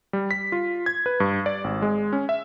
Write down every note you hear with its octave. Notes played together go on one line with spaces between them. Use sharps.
G3
B6
F4
G#6
B4
G2
D5
G#1
G#3
C#4
E5